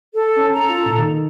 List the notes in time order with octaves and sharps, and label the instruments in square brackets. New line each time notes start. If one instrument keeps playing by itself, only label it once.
[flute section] A4
[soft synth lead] C#4
[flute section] A4 A#5
[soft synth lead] F4
A#2
D#3